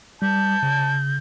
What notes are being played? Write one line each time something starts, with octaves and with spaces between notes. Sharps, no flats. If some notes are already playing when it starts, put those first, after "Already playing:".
G3 A5 G6
C#3